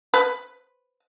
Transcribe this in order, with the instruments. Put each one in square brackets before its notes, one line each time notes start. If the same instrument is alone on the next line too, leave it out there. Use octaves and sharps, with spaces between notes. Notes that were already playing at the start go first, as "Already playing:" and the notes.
[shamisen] B4